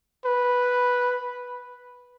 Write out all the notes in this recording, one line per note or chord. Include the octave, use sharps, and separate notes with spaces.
B4